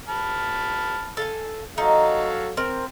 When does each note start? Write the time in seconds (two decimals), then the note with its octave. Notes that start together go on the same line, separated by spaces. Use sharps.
0.08 A5 B5 F6
1.17 A4 F5 G#5
1.78 F#3 D#4 A4 F5
2.57 C4 A#4